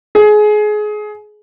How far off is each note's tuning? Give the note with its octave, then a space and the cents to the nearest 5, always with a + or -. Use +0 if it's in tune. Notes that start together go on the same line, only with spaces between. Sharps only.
G#4 +25